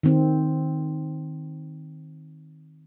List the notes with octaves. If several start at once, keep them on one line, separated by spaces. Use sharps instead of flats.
D#3 C4